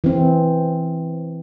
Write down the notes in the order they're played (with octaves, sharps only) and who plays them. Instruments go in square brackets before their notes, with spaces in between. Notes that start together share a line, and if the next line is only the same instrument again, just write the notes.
[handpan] E3 C4